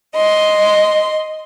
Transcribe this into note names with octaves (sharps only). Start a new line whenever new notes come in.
D#5 C6